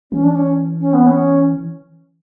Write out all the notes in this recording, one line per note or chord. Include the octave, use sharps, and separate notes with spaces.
E3 C#4
D4
C#4
C#4
B3
C#4